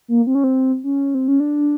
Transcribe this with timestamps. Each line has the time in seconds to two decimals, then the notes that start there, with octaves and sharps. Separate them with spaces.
0.08 A#3
0.27 C4
0.35 C#4
0.44 C4
0.84 C#4
1.15 C4
1.28 C#4
1.40 D4